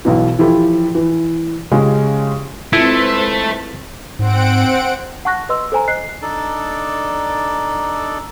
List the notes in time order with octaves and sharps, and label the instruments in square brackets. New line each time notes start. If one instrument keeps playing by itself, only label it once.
[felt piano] B1 B2 E3
E3 F3 E4 G4 A4
E3
C#3 G#3 C#4 F4 G4
[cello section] G#3 B4 C5 [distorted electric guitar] A3 [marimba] C4 F4 [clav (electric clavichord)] E4
[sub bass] G#2 [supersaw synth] C4 F#5 D7
[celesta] F#5 A5 C#6 F#6 A#6
B4 D#5 C6 E6
A4 C5 G#5 A#5
D#5 F#6 C7
[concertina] D4 D#4 A4 D5